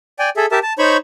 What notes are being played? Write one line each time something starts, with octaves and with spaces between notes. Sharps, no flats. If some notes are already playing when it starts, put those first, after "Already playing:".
D5 G5 G#5
G#4 A4 E5
G4 A#4 E5 A5
A5
D#4 C5 C#5 B5 C#6